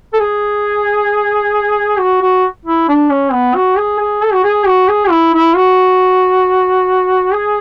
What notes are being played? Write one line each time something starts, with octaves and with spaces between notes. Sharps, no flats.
A4
G#4
F#4
F#4
E4
D4
C#4
B3
F#4
G#4
G#4
A4
F#4
G#4
F#4
G#4
E4
E4
F#4
G#4